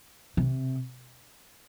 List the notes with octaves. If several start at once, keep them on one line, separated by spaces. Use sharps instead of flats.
C3